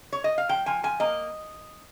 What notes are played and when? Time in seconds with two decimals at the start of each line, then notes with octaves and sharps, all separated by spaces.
0.13 C#5
0.24 D#5
0.38 F5
0.49 F3 G5
0.66 F3 G#5
0.83 F3 G#5
1.00 A#3 D#5